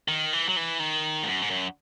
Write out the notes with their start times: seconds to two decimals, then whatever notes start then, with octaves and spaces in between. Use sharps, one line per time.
0.08 D#3
0.33 E3
0.49 F#3
0.56 E3
0.80 D#3
1.23 G#2
1.27 F#2
1.42 G#2
1.51 F#2